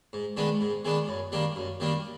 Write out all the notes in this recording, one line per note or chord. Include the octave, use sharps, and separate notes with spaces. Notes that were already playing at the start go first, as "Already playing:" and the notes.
G#2
D#3 G#3 B3 D4
G#2
D#3 G#3 B3 D4
F#2
D#3 G3 A#3 D4
F#2
D#3 G3 A#3 D4